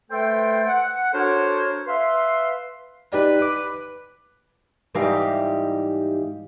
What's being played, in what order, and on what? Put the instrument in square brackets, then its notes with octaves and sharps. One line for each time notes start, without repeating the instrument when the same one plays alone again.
[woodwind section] A3 A4 B4 C5 G5
F#5
D4 F#4 A4 A#4 C5 C#5
B4 E5 F5 C6
[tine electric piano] D#4 G4 D5 [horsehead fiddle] B4
[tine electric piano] D6
[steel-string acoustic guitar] G#2 E3 G3 D#4 G4 F5